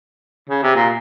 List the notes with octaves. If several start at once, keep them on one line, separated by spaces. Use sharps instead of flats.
C#3
C3
A#2